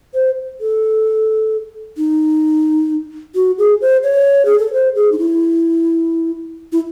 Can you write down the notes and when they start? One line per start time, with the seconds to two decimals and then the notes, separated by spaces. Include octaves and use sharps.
0.14 C5
0.61 A4
1.97 D#4
3.35 F#4
3.58 G#4
3.81 C5
4.03 C#5
4.45 G#4
4.59 A4
4.73 C5
4.95 G#4
5.12 D#4
5.19 E4
6.72 E4